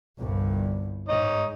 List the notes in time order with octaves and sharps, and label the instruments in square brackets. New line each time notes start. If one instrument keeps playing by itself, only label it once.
[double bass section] G1 C2 G2
[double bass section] G#2 [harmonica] D#4 C#5 D#5